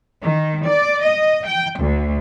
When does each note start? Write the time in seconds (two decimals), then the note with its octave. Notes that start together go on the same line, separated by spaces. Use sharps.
0.22 D#3
0.66 D5
1.03 D#5
1.46 G5
1.78 D2